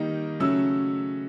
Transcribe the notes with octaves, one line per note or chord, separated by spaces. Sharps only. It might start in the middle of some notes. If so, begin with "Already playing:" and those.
Already playing: D#3 G3 A#3 D#4
C#3 F#3 A3 C#4 E6